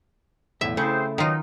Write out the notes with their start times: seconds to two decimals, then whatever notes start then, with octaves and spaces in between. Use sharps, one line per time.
0.61 B1 E2 A2 E5
0.77 C#3 A3 C4 E4 G#4 C5
1.18 B2 D#3 F#3 D#4 F4